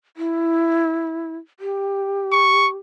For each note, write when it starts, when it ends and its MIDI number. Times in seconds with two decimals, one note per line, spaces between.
0.17 1.36 64
1.60 2.77 67
2.32 2.68 85